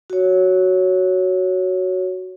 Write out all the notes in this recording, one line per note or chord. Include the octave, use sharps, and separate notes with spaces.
F#4 C#5